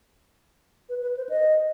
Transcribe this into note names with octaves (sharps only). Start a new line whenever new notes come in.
B4
B4
C5
D#5